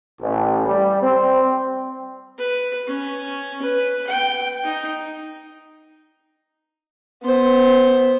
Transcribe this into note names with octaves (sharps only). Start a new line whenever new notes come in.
A1
G3
C4
B4
C#4
B4
G5
D#4
B3 C5